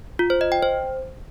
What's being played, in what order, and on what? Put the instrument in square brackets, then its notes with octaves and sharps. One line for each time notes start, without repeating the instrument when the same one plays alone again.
[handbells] F4
C5
D#5
G5
C5